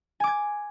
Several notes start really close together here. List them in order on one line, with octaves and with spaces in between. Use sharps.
G#5 D6 G#6